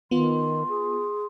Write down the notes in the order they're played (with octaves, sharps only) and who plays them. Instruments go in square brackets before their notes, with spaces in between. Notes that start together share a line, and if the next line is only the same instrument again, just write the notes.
[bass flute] D#3 [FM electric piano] B3 F4 [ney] C6
[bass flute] G#4